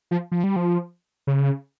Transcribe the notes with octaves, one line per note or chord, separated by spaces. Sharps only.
F3
F3
G3
F3
C#3